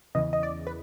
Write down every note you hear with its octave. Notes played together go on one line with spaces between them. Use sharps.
E2 C#3 E3 D#5
D#5
D5
B4